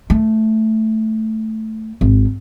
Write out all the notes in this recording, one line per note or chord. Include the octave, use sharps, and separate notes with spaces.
A3
G#1